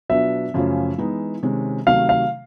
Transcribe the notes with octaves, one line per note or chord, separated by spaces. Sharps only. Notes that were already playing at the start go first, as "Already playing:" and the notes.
B2 F#3 B3 D4 F4 E5
F#2 C#3 F3 A3 C#4
E3 G#3 B3 D#4
C3 D#3 G#3 C#4
C3 D#3 F#3 A3 F5
F5